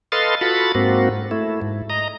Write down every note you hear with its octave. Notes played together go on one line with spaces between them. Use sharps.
A4 B4 D#5 F5 C6 A6
F4 F#4 A4 B5 A6
G#2 A#3 C4 F#4
A3 E4
G#2
D#5 A#5